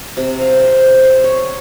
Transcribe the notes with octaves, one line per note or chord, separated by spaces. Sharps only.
C3
F5
C5
C5
C#5